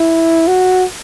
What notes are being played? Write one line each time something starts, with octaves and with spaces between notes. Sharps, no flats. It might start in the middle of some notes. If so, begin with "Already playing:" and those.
Already playing: E4
F#4